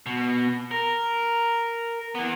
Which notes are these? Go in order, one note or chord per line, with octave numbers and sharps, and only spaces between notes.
B2
A#4
E3 B3